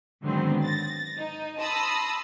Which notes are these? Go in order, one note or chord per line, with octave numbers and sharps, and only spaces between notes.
G#2 D3 D#3 F#3 B3 C4
A6 A#6
D#4
A5 B5 C6 D#6 E6 A#6